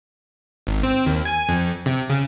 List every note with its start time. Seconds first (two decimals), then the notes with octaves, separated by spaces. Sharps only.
0.67 G#1
0.83 C4
1.06 D#2
1.25 G#5
1.49 F2
1.86 C3
2.10 C#3